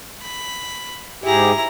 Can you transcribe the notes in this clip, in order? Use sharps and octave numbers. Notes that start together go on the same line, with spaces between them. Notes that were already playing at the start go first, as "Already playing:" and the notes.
B5
G#2 E4 G4 G#4 A#5